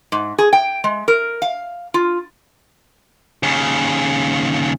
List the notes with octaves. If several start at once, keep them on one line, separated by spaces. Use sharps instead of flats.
G#2
G#4
G5
G#3
A#4
F5
F4
D#2 C#3